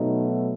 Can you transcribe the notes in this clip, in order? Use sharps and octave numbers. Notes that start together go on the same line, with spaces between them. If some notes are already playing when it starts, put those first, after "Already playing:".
Already playing: B2 F#3 A3 D#4